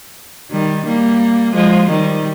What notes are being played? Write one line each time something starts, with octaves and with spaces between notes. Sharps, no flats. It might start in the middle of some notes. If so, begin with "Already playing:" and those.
D#3 G3
G3 A#3
F3 G#3
D#3 G3